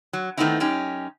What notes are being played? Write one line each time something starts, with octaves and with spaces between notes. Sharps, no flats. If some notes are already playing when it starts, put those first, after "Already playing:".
F#3
D#3 A3 B3 C4 D#4 E4
F#2 C#4 D#4 G4